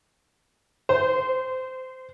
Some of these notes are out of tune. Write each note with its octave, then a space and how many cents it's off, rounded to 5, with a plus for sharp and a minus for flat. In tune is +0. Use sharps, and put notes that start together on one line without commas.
C5 -15